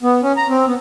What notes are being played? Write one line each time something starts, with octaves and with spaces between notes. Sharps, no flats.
B3
C#4
A#5
C4
B3